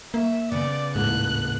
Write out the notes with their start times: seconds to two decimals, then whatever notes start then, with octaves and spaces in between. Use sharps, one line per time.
0.14 A#3 E5
0.52 C#3 B3 D5
0.96 D#1 A1 G#2 F#6